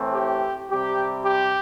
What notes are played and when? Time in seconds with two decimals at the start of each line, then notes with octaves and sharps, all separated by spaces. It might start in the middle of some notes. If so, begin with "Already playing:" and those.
Already playing: A2 E3 A3 C4
0.13 G4
0.69 C3 G3 C4 G4
1.25 G4